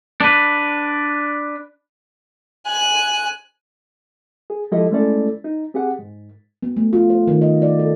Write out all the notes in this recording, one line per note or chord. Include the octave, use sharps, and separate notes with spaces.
D4 B4
G#5 F#6
G#4
F3 G#3 E4 G4 A4 D#5
G#3 A3 C#4 E4 A4 D5
D#4
C4 G4 G#4 F#5
G#2
B3
A3
F4
C5
D#3
D#5
D5
A4